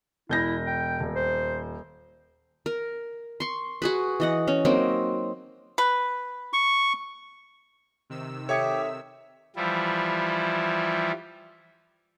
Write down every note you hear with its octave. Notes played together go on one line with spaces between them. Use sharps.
E1 E4 G6 A#6
G5
D#1
C5
A#4
C6 C#6
F#4 G#4 B4
E3 D#5 F#5
C#4
F#3 A#3 C4 D#4
B4
C#6
C3 D#3 E6
G4 A4 C#5 E5 D#6 G#6 C#7
E3 F3 G3 E4